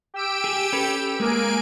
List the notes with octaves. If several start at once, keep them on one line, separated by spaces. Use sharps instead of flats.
G4 E6 D7
G#4
C#4 A4 B4
G#3 A#3 G#5 D7